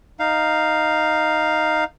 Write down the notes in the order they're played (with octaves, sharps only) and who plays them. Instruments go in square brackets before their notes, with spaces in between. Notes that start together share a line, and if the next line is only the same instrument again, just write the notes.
[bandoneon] D#4 F5